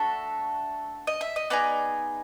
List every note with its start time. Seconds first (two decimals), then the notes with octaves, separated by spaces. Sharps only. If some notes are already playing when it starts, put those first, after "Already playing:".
Already playing: A3 D4 F#4 A4 E5
1.07 D#5
1.21 E5
1.36 D#5
1.50 B3 D#4 G#4 D5